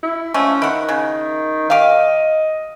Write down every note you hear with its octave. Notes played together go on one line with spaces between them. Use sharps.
E4
F3 G#3 A3 C#4
D#3 E4 F#5
C#3
G4 D#5 F5